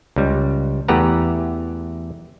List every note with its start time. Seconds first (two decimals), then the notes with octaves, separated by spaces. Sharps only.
0.16 C#2 G3
0.88 E2 A3 G4 B4 F#5 A#5